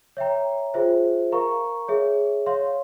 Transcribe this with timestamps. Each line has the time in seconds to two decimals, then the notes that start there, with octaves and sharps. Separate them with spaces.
0.17 C#5 E5 G5 A#5
0.74 F4 G#4 C5 E5
1.32 A#4 F5 A#5 C#6
1.88 G#4 C#5 E5
2.46 C#5 F5 C6